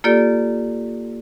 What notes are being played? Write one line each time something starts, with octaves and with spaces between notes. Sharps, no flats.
A#3 F4 G4 A4 D5